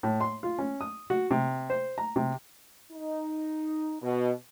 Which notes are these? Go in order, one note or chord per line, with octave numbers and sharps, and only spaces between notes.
A2
C6
F4
C#4
D#6
F#4
C3
C5
A#5
C3
D#4
B2